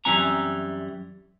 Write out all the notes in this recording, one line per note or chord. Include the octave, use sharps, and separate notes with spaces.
F#2 E3 G3 C4 G#5 A#5